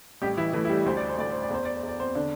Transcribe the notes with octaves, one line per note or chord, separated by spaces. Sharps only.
A1 G3 G4
E3 E4
E3 A3 E4
E4
G3 G4
D2 C5
D5
C5
D2 D5
C5
D5
E2 C5
D5
C5
E2 D5
C4 C5
D3 D4